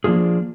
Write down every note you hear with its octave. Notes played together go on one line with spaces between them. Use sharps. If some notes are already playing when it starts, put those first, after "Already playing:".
F3 A#3 D4 F4 G#4